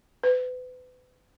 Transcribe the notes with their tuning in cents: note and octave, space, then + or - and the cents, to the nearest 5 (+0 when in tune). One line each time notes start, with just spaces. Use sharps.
B4 +35